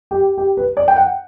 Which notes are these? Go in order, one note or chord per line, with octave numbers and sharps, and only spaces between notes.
G4
G4
B4
D5
G5
F#5